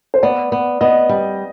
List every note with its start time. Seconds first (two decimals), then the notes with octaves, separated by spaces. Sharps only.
0.14 C5
0.23 B3 D5
0.52 B3
0.81 B3 D#5
1.09 G3